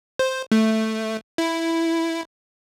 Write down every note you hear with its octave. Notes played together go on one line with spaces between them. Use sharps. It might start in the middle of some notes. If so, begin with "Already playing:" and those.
C5
A3
E4